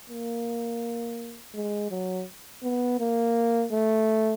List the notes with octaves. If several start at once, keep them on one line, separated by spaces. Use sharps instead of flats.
A#3
G#3
F#3
B3
A#3
A3